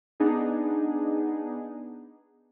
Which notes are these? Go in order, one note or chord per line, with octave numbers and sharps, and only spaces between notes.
B3 D4 D#4 G#4